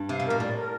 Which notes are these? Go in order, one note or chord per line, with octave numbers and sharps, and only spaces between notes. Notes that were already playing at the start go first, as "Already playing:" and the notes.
Already playing: G2
C3 F5
B2
A#2 A#4
A2 D5
A#4